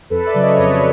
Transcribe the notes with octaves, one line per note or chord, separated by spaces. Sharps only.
F2 A4 B4
D5 E5
C#3 F#3
C#5 D#5
F2 B4 C#5